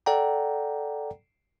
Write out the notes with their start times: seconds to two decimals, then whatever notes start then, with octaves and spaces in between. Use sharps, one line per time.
0.06 A4 D5 F#5 G5 A#5